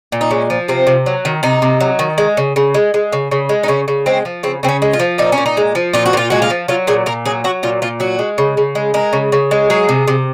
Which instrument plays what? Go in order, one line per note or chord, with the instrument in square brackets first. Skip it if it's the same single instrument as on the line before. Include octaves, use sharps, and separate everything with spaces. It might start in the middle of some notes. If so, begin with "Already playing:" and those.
[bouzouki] A#2
D#4
G#3 C#4
F3
C3 C4
C3
F#3
D#3
C3 D#4
C3
F#3
D#3
G#3
C#3
C#3
G#3
G#3
C#3
C#3
G#3
D#4
C#3 C#4
C#3
G#3 C4
F3
C#3 C4
C#3 C4
C#4
G#3
F4
F3
A#2 D#4
C#4
A#2
D#4
G#3
F3
A#2 F4
F#4
A#2 F4
G#3 F#4
F4
F3
F#3 F4
A#2 G#4
A#2 A#4
F#3 G#4
F#3 F#4
A#2 F4
A#2 F4
F#3 F#4
G#3
C#3
C#3
G#3
G#3 A#4
C#3
C#3
G#3
F#3 G#4
C3
C3